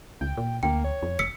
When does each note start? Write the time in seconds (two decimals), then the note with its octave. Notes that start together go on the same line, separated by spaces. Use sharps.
0.21 C#2 G5
0.37 A#2
0.63 D2 A#3 G5
0.84 C#5
1.03 F2
1.19 F1 E6 B6 C#7